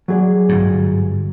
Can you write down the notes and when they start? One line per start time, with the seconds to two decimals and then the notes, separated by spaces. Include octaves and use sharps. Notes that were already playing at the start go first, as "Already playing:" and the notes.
0.08 F#3 G#4 D5
0.49 G1 G#2